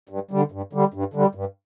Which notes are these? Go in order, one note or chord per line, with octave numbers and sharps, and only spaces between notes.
G2
D3 G3
G2
D3 G3
G2
D3 G3
G2